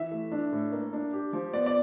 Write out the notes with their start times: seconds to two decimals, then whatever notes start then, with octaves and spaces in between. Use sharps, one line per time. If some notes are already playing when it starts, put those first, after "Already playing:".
Already playing: E3 E5
0.11 A3
0.32 D4
0.52 A2
0.72 A#3
0.93 D4
1.13 G4
1.33 F3
1.53 B3 D5
1.66 D5